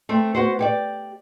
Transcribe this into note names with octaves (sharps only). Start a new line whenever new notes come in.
A3 C4
B3 F#4 C5
G4 C#5 D5